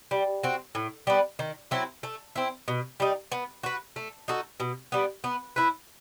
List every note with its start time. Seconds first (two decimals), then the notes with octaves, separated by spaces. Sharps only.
0.11 G3
0.43 C4 F#4
0.75 A2
1.07 G3 B3
1.39 D#3
1.71 F#3 C4 E4
2.03 A3
2.36 C4 E4
2.68 B2
3.00 G3 D#4
3.32 B3
3.63 F#4 B4
3.96 A3
4.28 D#4 F#4 A4
4.60 B2
4.92 G3 B3
5.24 B3
5.56 E4 B4